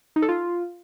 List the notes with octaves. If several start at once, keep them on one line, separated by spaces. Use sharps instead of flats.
D#4
A4
F4